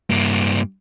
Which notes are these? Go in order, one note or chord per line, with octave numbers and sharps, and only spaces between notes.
G2 A#3